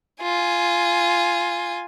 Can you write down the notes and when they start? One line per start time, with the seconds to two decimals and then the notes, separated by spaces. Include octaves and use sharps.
0.23 F4 G#5